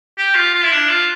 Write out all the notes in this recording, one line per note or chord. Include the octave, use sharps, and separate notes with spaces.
G4
F4
F4
E4
D4
F4